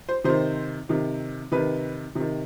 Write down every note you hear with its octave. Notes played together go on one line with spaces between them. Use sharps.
C5
C3 D#3 C5
C3 D#3
C3 D#3 B4
C3 D#3